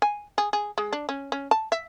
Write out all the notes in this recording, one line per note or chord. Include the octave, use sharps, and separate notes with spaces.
G#5
G#4
G#4
G#3
D4
C#4
C#4
A5
E5